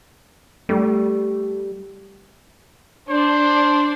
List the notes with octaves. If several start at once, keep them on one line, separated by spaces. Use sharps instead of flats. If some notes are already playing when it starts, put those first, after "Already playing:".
G3 A3
D4 C5